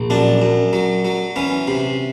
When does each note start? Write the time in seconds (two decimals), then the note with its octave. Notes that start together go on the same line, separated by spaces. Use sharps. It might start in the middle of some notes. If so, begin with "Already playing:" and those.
Already playing: A#1
0.10 F#2 D4
0.42 F#2
0.73 F#3
1.05 F#3
1.36 E3 C#4
1.68 C3